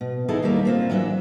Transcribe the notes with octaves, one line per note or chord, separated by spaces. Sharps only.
B2
E3 D#4 E4 G#4 A4
D#2 G3 A3 A#3
A#3 C4 F4
E3 F#3 D4 D#5 E5